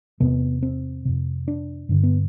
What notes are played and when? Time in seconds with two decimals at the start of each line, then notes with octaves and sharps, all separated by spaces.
0.20 E2 C3 B3
0.62 C4
1.05 F2 C3
1.48 D4
1.89 G2 D3
2.03 B3